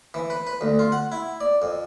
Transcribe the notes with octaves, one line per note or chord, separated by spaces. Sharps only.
E3
B4
B4
D2
F4
F#5
E4
D5
F2